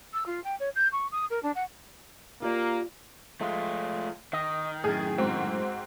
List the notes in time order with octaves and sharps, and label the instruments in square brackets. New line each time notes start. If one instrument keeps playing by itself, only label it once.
[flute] E6
F4
G5
C#5
G6
C#6
D#6
A#4
D4
F#5
[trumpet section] A#3 [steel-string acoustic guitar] F4 G4 D5
[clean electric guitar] F3 G#3 [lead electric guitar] A3 F4
[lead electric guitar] D#3 [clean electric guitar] D#5
[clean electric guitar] F#2 A2 [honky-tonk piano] G#4
[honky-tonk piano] G#2 C4 F#4